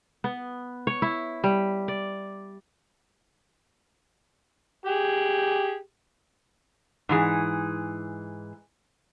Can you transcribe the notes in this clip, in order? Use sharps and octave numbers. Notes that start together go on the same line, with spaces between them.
B3
C#5
E4
G3
D5
G4 G#4
G#2 E3 G#4